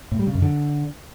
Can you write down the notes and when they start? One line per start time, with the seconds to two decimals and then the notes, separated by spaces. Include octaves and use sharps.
0.12 A2
0.19 G3
0.27 C#3
0.35 F#2
0.42 D3